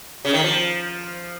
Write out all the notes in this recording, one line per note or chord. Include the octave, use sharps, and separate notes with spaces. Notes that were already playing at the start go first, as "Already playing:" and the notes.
C#3
D#3
F3